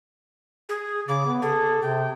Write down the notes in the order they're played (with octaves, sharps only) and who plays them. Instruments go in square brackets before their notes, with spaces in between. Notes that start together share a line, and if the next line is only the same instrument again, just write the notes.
[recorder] G#4
[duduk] C#3 [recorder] D6
[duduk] B3
[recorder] G#4 [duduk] A4
[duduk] C3 [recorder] G5